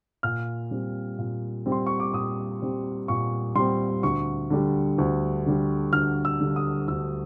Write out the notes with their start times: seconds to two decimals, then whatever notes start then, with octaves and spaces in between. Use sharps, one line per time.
0.23 A#2 F6
0.71 G3 C4
1.18 A#2
1.66 G3 C4
1.72 C6
1.86 C#6
2.00 D6
2.13 A#2 D#6
2.62 G3 C4
3.08 A#2 C#6
3.56 G3 C4 C6
4.03 D2 C#6
4.50 D3 G3
4.98 D2
5.46 D3 G3
5.93 D2 F6
6.25 E6
6.40 D3 G3
6.56 D#6
6.88 D2 E6